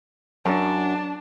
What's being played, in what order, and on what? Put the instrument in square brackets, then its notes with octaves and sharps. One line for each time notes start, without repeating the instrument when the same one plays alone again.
[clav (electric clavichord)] F#2 [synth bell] F#3 [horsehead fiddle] D4 [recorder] A5